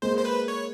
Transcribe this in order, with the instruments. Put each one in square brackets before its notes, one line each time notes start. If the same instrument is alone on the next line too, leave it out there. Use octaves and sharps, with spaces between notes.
[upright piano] G#3 A#3 [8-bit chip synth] C5
[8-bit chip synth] C5
B4
C#5